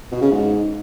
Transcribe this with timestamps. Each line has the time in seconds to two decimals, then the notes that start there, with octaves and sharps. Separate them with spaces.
0.12 B2
0.22 C#3
0.32 G#2